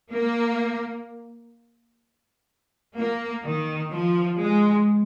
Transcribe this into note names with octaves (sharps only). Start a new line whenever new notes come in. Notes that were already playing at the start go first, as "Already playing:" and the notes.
A#3
A#3
D#3
F3
G#3